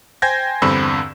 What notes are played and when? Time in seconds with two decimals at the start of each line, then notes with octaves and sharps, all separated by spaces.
0.22 C5 G5 G#5 G6 G#6 A#6
0.62 E2 G2 D3 C4 B5 E6